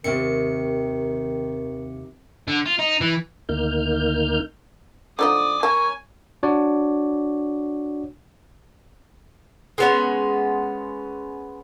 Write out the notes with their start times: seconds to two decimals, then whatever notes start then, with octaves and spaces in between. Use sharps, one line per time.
0.04 D#2 C3 D#3 C4 C#7
2.48 D3
2.66 F4
2.79 D#4
3.01 E3
3.49 D2 D#3 A#3 D#4 F6 G6
5.19 D3 F3 D#4 D5 D#6
5.63 A#4 C#5 G#5 A5
6.43 D4 F#4 C#5 D5
9.78 G#3 B3 C#4